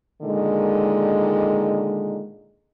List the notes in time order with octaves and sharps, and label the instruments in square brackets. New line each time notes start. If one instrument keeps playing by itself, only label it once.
[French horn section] A#2 D3 D#3 G#3